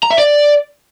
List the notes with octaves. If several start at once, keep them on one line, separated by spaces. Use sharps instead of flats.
A#5
E5
D5